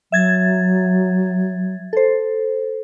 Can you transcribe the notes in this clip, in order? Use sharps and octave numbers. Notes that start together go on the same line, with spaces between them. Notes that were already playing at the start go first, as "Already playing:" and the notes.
F#3 E5 G#6 A6
A4 C5